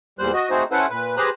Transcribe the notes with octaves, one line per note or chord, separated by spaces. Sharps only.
E2 A#2 G3 C5 F#6
F#4 D#5
A3 C4 D#4 F#4 G#4 C5
C#4 E4 A4 B4 C5 F#5
A#2 B4
G4 G#4 B4 C5 A#5 F#6